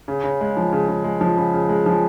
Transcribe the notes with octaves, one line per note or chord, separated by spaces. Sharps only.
C#3
C#3
G#3
F3
C#3
C#3
G#3
F3
C#3
C#3
G#3
F3